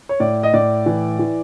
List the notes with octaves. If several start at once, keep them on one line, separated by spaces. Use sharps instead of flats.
C#5
A2 D5
D#5
A2 D5
E3
E3